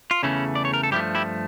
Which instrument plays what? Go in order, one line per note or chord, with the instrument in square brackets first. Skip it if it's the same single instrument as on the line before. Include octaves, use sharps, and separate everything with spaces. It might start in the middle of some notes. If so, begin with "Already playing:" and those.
[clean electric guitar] F4
E2 C#3 E3 A3 C#4 E4
D5
C#5
A#4
A4
G2 F3 A3 E4 G4
E4 G4